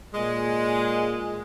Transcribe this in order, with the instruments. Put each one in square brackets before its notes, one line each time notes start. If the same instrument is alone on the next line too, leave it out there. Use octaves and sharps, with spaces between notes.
[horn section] A#2 G#3